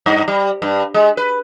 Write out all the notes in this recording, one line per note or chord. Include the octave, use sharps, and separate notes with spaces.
G2
G3
G2
G#3
B4